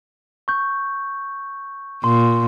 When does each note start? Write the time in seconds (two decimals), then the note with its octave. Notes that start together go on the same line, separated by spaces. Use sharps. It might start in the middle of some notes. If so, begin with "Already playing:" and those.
0.48 C#6 G6
2.04 A#2 C6